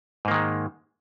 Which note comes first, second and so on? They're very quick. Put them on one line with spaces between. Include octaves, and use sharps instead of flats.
G#2 A#3 D#3 G#3